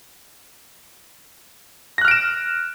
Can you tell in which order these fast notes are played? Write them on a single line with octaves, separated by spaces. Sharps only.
A#6 F#6 F6 D7 E7